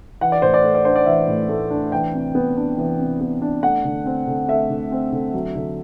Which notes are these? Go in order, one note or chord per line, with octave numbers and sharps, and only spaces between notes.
E3 F#5
D5
A2 C5
D5
A3
D5
D4 C5
D5
E3 E5
A2
A3
D4
E3 G5
C3
B3
D4
E3
C3
B3
D4
A3 F#5
D3
C4
D3
A3 E5
D3
C4
D3
F#3
D3